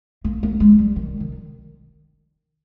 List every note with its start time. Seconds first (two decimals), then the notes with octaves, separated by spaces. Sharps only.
0.24 A#3
0.43 A#3
0.60 G#3
0.78 G3
0.96 D#3
1.20 D#3